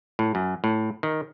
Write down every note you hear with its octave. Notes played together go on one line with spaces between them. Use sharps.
A2
F#2
A2
D#3